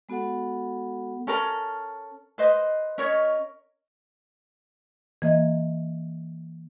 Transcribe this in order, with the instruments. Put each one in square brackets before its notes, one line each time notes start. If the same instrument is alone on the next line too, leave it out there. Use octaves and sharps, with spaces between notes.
[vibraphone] G#3 B3 F#4 A4 F#5
[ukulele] C#4 A4 A#4 A#5
B4 C5 D#5
C#4 A#4 C#5 D#5
[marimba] E3 A#3 D#5